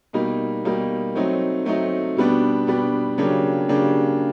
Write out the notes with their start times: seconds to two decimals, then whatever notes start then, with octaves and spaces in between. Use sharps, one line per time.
0.13 B2 G3 A#3 D#4
0.65 B2 G3 A#3 D#4
1.15 F#3 A3 C4 D#4
1.66 F#3 A3 C4 D#4
2.17 B2 G3 B3 D4
2.67 B2 G3 B3 D4
3.18 C#3 F#3 A#3 D4 G4
3.69 C#3 F#3 A#3 D4 G4